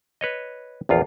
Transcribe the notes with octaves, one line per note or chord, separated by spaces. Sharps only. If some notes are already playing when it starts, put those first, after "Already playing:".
B4 C#5 D#5
A#1 E2 F4 F5